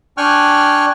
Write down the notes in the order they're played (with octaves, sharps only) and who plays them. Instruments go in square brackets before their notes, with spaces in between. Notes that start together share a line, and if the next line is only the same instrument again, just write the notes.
[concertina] D4 G5 G#5 C#6 F6 F#6